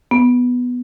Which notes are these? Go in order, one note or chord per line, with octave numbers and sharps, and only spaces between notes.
B3